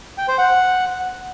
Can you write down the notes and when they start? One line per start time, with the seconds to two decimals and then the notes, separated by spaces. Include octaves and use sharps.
0.18 G5
0.28 C5
0.38 F#5